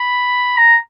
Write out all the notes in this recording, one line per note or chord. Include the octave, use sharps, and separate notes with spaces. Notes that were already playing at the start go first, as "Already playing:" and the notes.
Already playing: B5
A#5